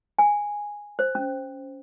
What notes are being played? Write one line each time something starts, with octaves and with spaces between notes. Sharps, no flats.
G#5
C5
C#4